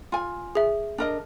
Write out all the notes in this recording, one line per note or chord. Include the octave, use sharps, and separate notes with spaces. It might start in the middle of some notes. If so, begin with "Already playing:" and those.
F4 G#5
G#4 E5
D4 A#4 D#5